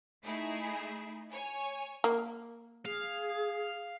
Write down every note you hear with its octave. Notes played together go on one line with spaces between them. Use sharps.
A3 D#4 E4 G#4
C#5 G#5
A#3
G#4 F5